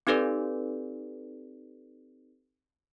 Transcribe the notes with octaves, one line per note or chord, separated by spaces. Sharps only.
C4 D#4 G4 A4 B4 D5